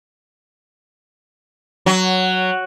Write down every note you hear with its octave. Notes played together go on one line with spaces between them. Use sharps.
F#3